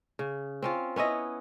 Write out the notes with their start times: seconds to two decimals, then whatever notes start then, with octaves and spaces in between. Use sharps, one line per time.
0.19 C#3
0.62 C4 C#4 F4
0.96 B3 C#4 E4 D#5